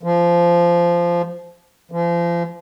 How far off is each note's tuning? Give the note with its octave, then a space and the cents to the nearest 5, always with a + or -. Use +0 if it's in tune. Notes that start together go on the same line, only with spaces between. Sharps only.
F3 -15
F3 -35